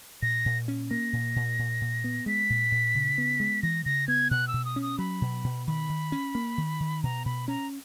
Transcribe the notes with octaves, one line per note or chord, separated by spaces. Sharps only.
A#2 A#6
A#2
C#4
A#3 A#6
A#2
A#2
A#2
A#2
B3
G#3 B6
A#2
A#2
C#3
B3
G#3
E3 A#6
C#3 A#6
B3 G#6
B2 F#6
E6
B2
D#6
C#4
D#6
F#3 B5
B2
B2
D#3 B5
D#3
C#4
A#3
D#3
D#3
B2 A#5
B2 B5
C#4 A#5